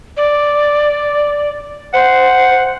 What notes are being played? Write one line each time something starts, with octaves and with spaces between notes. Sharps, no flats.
D5
C5 F#5